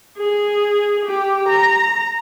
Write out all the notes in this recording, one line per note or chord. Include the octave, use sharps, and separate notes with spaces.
G#4
G4
A#5